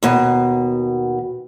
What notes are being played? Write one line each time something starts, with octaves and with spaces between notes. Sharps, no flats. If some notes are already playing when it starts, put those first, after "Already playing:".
D#2 B2